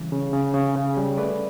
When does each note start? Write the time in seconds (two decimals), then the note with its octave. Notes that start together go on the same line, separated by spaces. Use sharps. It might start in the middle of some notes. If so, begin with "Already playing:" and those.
Already playing: C#3 E3 G3
0.12 C#3
0.33 C#3
0.54 C#3
0.76 C#3
0.97 G3
1.18 A3 B4 D5